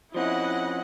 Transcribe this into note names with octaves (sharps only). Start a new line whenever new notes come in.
F3 C4 C#4 E4 D#5 F#5